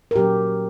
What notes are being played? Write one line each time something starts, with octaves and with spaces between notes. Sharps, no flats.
A#4
A#2 F#3 C#4 G4